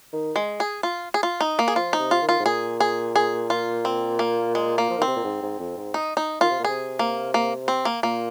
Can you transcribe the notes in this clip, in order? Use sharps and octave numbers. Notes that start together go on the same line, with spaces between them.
D#3
G#3
G#4
F4
G#4
F4
D#4
A#3
G#4
F3 F4
D#4
C3
F4
D#3
F4
G#2
A#2 G#4
G#4
G#4
F4
C4
A#3
G#3
A#3
F3
D#3 C4
C3
A#2
G#2
G#2
F2
G#2
D#4
D#4
D#3 F4
C3
A#2
C3 G#4
A#3
A#3
C4
A#3
A#2 A#3